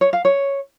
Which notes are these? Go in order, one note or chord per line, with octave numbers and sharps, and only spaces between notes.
C#5
F5
C#5